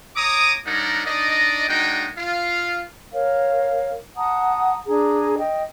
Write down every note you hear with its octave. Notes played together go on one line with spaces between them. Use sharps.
C#5 A#5 D6 D#6
G3 D4 D#4 A#4 C#5 F#5
D4 D#4 D5 D#5
G#3 A#3 D4 D#4 F#4 G5
F4 F5
A#4 C#5 F5
F#5 A5 A#5 D#6
D4 G#4 A#5
D#5 G5